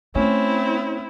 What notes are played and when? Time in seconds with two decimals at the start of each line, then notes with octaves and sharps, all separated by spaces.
0.15 A3 C4 C#4 E4